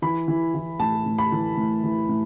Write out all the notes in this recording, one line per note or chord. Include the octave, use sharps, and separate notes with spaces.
E3 B5
E3
E3
A2 A5
A2
B5
E3
A2
E3
A2